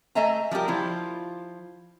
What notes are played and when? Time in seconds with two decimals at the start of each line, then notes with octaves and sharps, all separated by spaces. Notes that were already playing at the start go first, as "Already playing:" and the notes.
0.15 A3 A4 D#5 E5 G#5 A#5
0.51 F3 G3 F4 G4 A#4
0.68 F3 E4 F4